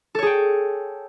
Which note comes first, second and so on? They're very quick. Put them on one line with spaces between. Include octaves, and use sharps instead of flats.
A4 C#5 G#4 G5